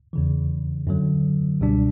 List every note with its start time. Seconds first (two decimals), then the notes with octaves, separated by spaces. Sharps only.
0.13 E2 C#3 E3
0.87 F#2 D3 F#3
1.60 C#2 B2 G3 D4